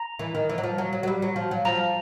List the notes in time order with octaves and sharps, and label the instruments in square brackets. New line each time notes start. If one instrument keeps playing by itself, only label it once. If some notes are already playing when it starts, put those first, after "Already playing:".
Already playing: [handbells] A#5
[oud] E3
D#3
E3
F#3
F3
F#3
F#3
F#3
G3
F#3
F3
F#3
[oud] F3 [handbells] A#5